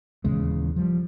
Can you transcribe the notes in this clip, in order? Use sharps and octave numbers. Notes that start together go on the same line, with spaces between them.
D#1 E2 C#3 G#3
F3 G3